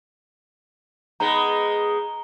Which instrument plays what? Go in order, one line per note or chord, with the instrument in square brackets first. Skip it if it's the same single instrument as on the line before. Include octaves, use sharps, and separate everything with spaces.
[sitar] G#3 B3 D#4 [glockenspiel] A#5 G7